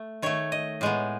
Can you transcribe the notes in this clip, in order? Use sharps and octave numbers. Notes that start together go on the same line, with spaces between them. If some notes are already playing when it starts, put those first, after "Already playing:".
Already playing: A3
D#3 A3 C#5
D#5
A2 G#3 B3